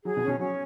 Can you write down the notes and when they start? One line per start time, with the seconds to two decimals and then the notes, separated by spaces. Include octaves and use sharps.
0.05 F#3 G#4
0.17 B2
0.23 C#4
0.28 B2
0.39 F#3 C#4